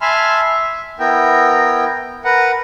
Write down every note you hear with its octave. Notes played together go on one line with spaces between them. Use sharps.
E5 G#5 A5 B5 C6 F6
E5
B3 E4 A#4 G5
A#4 B4 F#5